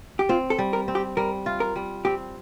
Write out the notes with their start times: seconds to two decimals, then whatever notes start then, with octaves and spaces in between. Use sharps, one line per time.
0.19 G4
0.29 C4 F4
0.50 A4
0.58 G3
0.73 A#4
0.88 C4
0.95 G4
1.17 G3 A#4
1.46 F4
1.60 A#4
1.76 G3
2.05 C4 G4